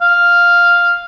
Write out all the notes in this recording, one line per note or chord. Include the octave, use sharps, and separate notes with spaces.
F5